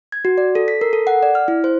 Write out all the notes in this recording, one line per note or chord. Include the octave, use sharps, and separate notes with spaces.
G#6
F#4
D5
A4
B6
A#4
A4
F#5
D5
F6
E4
C5